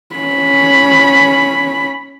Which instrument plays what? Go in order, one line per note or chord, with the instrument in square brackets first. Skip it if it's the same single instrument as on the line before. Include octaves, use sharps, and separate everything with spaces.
[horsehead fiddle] C#4 B5